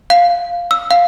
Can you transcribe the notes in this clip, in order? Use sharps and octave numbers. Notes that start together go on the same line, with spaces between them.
F5
E6
F5